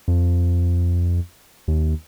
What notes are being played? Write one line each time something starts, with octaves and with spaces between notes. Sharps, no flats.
F2
D#2